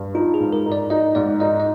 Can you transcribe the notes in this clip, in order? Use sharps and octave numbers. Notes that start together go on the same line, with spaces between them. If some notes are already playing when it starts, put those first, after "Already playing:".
Already playing: G2
D#4 F4
G#4
G#2
A#4
D#4
D5
D#4 D#5
G#2 D5
D#4 D#5
D#5